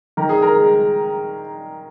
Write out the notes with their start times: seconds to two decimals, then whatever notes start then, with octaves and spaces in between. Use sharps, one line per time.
0.17 D#3 A#4
0.29 G#4
0.42 A#4
0.58 G#3